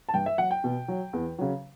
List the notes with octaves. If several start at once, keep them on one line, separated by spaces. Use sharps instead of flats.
A5
G2 G5
E5
F#3 F#5
G5
B2
F#3
E2
C#3 F#3